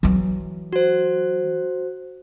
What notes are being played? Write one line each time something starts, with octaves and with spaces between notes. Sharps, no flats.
E3 F#3
F#4 C5